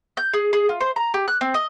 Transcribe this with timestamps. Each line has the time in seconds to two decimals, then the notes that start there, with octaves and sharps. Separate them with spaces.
0.17 G6
0.34 G#4
0.53 G#4
0.69 F4
0.81 C5
0.96 A#5
1.14 G4
1.28 F#6
1.41 C4
1.54 D#5